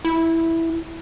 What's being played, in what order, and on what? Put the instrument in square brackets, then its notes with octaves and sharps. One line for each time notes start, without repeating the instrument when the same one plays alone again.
[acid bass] E4